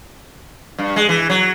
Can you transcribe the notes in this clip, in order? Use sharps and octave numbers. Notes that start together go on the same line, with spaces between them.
G2
G#3
E3
F#3